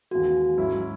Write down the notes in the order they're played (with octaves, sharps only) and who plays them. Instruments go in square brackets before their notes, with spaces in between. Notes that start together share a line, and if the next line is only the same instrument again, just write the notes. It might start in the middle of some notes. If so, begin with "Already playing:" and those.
[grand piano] D#2 C#3 E3 G#3 [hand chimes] F#4
[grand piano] G#2 F#3 C#4 E4